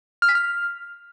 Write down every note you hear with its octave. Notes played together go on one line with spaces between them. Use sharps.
F6
B6
F6